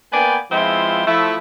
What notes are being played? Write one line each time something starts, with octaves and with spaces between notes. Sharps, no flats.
A#3 B3 B4 D5 G5 G#5
F3 G#3 B3 C4 E4 F4
F3 A3 E4